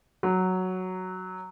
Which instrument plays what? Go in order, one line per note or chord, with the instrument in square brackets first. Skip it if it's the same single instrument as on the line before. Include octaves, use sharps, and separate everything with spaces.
[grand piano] F#3